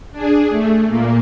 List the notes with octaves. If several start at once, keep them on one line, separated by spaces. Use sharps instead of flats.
D4 G#4
A3
A#2 A#3